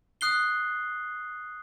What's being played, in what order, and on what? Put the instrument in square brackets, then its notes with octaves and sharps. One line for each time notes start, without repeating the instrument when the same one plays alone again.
[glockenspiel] D#6 F#6 C7 G7